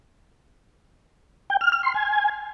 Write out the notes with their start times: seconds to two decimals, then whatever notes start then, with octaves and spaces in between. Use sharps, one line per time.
1.50 G5
1.61 F6
1.72 F6
1.83 C6
1.94 G#5